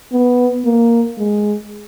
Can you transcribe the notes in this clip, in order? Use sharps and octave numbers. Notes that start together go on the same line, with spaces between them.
B3
A#3
G#3